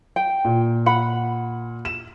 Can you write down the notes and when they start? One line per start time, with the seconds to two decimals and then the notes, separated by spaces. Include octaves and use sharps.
0.16 G5
0.45 A#2
0.86 F#5 B5
1.85 E7